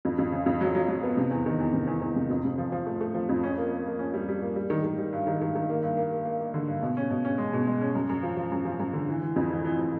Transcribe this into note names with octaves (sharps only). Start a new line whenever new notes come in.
F2
F2
C#3
F2
F#3
F#3
F#3
B3
C3
E2
D#3
E2
C3
E2
E2
C3
F2
C3
F3
F3
A3
A3
F3
F2
C#4
A#3
A#3
A#3
C#4
G3
G3
A#3
G3
D#3
D#3
G3
G2
D#3
D#3
D#3
A#3
G2
A#3
A#3
A#3
A#3
D3
G2
B2
C#4
B2
C#4
G#3
B2
G#3
C#4
F#2
F#2
F3
F3
F#2
F3
F#2
D3
E3
E3
F2
E3
E3
E3